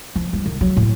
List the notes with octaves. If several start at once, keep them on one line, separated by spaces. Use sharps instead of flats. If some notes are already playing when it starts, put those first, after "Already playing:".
F3
G3
D#3
F#3
A2